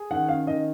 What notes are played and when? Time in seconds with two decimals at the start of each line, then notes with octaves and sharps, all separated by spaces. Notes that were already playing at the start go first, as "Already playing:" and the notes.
Already playing: G#4
0.10 D#3 F#5
0.29 C#4 F5
0.47 D#3 D#5